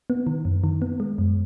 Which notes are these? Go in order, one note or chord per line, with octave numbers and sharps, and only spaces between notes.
B3
D#3
F#2
D#3
B3
G#3
F#2